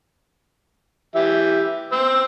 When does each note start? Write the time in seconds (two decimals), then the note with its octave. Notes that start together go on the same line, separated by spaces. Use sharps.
1.15 E3 G4 E5
1.92 C5 E6